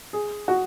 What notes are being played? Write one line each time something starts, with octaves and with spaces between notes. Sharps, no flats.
G#4
F#4